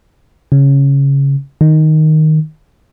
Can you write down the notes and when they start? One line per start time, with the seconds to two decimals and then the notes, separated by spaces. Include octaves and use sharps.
0.52 C#3
1.61 D#3